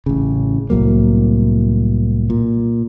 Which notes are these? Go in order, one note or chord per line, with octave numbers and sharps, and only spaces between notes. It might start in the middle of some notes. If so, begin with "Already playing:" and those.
A1 C#3
C2 A2 F#3 A#3
A#2